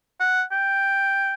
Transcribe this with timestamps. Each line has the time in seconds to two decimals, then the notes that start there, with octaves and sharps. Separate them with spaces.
0.20 F#5
0.52 G5